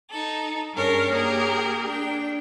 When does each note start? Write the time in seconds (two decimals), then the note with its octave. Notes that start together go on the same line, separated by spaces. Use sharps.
0.10 D#4 A4
0.75 G2 C#4 G#4 A#4 C#5 A5
1.11 A#3 G4 G#4 A#4
1.85 D4 G5